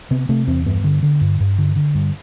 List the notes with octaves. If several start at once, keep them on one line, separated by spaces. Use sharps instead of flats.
C3 B3
C3 A3
E2 C4
G2 B3
D3
D3
G2
G2
D3
D3
G2